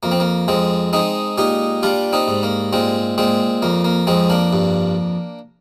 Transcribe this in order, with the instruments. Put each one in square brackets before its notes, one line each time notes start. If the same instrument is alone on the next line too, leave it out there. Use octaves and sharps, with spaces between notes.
[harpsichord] F2 A#3
C4
A#3
F2 G#3 C4
G#3 C4 D#4
A#2 D#4 G4
G3 D4 F4
C4 D#4
G#2
A#3
A#2 G#3 C4
A#2 G#3 C4
F2 A#3
A#3
F2 G#3 C4
A#3 D4
G2